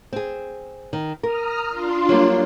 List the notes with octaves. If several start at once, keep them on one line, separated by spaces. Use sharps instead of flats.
C4 G#4
D#3
A#4 A#5 D#6 F6
D4 F4 C6
F#3 G3 A#3